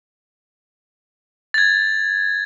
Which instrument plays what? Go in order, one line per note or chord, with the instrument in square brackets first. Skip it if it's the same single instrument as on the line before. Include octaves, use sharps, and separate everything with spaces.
[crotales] G#6 A6